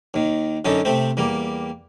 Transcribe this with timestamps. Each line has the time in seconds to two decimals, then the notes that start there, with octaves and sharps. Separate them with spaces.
0.14 D#2 D#3
0.65 F#2 D3 C#4 D#4 A4
0.85 C3 A3 C4
1.17 E2 G3 A#3